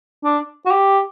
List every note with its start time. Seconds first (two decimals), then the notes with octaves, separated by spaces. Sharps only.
0.24 D4
0.66 F#4
0.71 G4